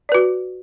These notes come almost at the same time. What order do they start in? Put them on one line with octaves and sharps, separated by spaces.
D5 B4 F#4